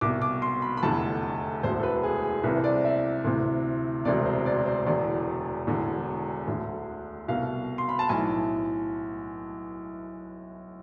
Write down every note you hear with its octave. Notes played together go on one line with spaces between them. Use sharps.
C2 B2 D6
D6
C6
B5
B5
F1 E2 D3 A5
E1 D2 D3 C5
A4
B4
G#4
G#4
C2 C3 E3 B4
C5
D5
E5
D2 C3 E3
E1 D2 C3 D5
C5
D5
C5
E1 E2 D3 D5
E1 E2 D3
D2 D3
C2 B2 F5
C6
B5
A5
B1 A2 E3 G#5